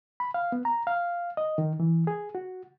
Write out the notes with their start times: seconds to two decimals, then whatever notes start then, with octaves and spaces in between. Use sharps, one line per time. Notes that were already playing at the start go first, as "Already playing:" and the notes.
0.20 B5
0.34 F5
0.52 B3
0.65 A#5
0.87 F5
1.37 D#5
1.58 D#3
1.80 E3
2.07 G#4
2.35 F#4